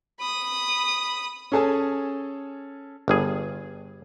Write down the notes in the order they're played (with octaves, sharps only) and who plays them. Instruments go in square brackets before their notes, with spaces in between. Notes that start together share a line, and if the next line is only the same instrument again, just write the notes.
[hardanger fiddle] B5 D#6
[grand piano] C#4 G#4 A4 G#5 A5
[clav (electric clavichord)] G1 G2 G#4